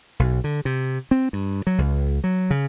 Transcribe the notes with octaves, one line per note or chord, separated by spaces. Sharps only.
B1
D3
C3
C4
G2
F#3
C#2
F#3
C#3